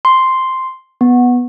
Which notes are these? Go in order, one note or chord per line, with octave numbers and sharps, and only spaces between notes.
C6
B3